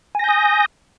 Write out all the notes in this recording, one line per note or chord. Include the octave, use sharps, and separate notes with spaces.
G#5 D#6 G6 A#6